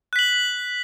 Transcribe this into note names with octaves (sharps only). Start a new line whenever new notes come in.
F#6 B6 F#7